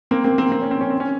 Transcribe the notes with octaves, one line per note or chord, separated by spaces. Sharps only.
A#3 C4
A#3 C4
A#3 C4
C4
C#4
C4
C#4
C4
C#4